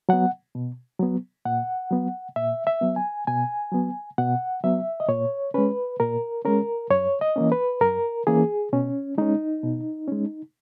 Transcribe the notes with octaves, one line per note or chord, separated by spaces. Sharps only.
F#3 B3 F#5
B2
F#3 B3
A#2 F#5
F#3 B3
A#2 E5
E5
F#3 B3
G#5
B2 G#5
F#3 B3
B2 F#5
F#3 B3 E5
D#5
A#2 C#5
G#3 C#4 B4
A#2 A#4
G#3 C#4 A#4
F#2 C#5
D#5
E3 A#3 C#4
B4
F#2 A#4
E3 A#3 C#4 G#4
B2 C#4
G#3 C#4 D#4
B2
G#3 C#4